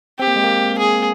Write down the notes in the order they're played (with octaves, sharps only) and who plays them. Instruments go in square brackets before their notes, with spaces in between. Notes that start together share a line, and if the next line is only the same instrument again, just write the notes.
[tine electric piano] C4 [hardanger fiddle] G4
[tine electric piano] A#3
G#3
A#3
[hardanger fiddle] G#4